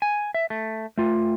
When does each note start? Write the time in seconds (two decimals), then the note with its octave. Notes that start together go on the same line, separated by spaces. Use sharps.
0.02 G#5
0.34 E5
0.50 A3
0.98 A3 F4